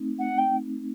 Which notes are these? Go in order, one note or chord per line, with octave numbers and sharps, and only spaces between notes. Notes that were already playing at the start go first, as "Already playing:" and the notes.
Already playing: A3 C4 D#4
F#5
G5